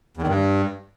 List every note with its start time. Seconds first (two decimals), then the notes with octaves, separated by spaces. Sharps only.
0.17 E2
0.22 D#3
0.27 G2